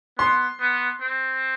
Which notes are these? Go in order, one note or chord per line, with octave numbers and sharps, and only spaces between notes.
B3 C6
B3
C4